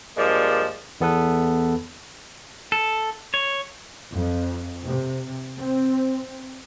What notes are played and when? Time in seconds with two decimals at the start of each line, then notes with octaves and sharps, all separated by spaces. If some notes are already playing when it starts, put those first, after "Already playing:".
0.17 G2 F3 G#3 A#3 D5
1.01 E2 B3 A4 B4
2.72 A4
3.34 C#5
4.13 F2
4.83 C3
5.58 C4